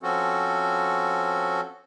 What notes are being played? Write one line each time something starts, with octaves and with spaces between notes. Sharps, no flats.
F3 C4 C#4 F#4 A4